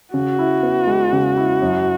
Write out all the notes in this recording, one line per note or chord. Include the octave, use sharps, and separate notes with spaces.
C#3 F#4
E4
B3
G#3
C#3
E4
F#2